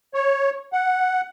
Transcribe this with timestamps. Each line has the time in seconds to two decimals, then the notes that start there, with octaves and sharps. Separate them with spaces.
0.14 C#5
0.73 F#5